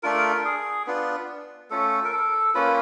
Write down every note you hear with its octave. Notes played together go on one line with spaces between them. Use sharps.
A3 D4 F4 A#4
G#4
B3 D4 F4
A3 C#4 F4 A4
A#4
A4
A#3 C#4 F4 B4